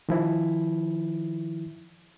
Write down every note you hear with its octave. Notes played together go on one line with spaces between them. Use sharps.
D#3 F3 E4